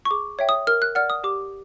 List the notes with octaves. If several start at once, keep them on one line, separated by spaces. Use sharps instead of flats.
C#6
G#4 D6
C#5 E5 G5
D#6
A#4 F6
F#6
D5 F#5 F6
D#6
G4 D6